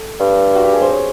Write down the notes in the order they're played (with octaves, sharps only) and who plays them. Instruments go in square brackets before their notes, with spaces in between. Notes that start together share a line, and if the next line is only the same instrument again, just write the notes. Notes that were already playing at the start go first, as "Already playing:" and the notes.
Already playing: [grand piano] A4
[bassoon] G2
[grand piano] F#4
G4
G#4
C5
C#5